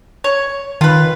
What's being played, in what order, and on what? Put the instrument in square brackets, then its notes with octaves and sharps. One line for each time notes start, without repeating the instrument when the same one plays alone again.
[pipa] C#5
[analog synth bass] D#3 [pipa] F4 B4